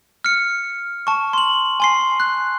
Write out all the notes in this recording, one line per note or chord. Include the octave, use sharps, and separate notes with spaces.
F6 C#7
A5 C#6
C6 F#7
G#5 C6 C7
F#6